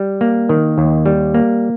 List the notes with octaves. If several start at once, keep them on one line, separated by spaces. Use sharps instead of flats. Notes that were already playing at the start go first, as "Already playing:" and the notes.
Already playing: G3
A#3
D#3
D#2
G3
A#3